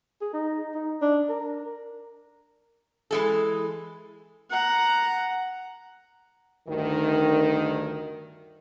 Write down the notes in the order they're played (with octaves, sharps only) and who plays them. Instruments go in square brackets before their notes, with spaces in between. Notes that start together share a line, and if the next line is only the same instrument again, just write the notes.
[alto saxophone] G#4
D#4
D#4
D4
A#4
[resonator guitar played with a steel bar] E3 G#3 A4
[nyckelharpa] F#5 A#5
[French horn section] D2 G2 D#3